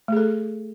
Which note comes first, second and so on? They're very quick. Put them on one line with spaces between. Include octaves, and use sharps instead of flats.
A3 G#4 A4